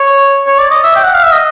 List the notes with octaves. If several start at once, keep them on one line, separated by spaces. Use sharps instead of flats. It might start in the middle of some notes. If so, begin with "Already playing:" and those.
Already playing: C#5
C#5
D5
D#5
E5
G5
F#5
F5
E5
D#5